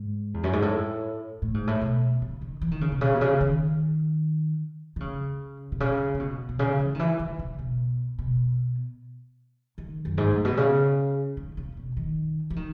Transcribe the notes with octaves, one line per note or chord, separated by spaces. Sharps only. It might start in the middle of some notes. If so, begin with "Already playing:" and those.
Already playing: G#2
E2
F#2
G#2
A2
A2
G#2
A2
B2
C#3
D#3
E3
D#3
C#3
B2
C#3
B2
C#3
D#3
D#3
C#3
B2
C#3
C#3
B2
B2
C#3
E3
D#3
E3
D#3
C#3
B2
B2
D#3
F#2
G#2
A2
B2
C#3
D#3
C#3
B2
D#3
E3
D#3